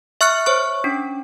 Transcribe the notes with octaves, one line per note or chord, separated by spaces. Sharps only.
E5 C#6 F6 F#6 C#7
C5 C#5 C#6
C#4 D4